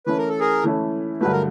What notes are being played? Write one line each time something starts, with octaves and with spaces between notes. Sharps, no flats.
E3 A3 C#4 E4 B4
A#4
A4
G#4 A#4
E3 A3 C#4 E4
G2 D3 F#3 A3 B4
A#4